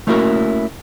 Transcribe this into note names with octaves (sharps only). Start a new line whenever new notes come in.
A3 A#3 C#4 E4 F#4 A#4